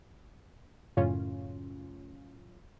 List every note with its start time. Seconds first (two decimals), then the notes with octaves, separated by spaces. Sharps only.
0.97 F#2 A2 C#3 C#4 F4